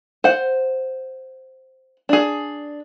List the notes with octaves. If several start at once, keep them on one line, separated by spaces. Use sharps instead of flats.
C5 F#5
D4 G#4